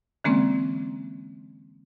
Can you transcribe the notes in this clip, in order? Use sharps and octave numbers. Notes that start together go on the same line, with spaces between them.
D3 E3 G#3 A#3 C4 C#4